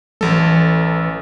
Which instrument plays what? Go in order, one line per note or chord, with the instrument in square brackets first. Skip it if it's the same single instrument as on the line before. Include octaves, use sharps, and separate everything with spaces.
[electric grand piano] A1 A4 [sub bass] E3